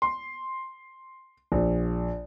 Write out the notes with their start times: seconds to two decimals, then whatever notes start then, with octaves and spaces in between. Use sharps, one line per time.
0.02 C6
1.52 A#1